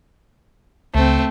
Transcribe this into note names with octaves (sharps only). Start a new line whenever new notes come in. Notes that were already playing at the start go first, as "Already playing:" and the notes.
C#2 A3 C4